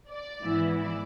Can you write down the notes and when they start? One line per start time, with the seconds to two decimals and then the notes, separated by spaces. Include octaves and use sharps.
0.09 D5
0.42 G#2 E3 B3 E4
0.75 D5